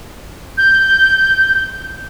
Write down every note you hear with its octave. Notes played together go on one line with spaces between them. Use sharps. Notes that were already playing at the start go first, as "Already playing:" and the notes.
G6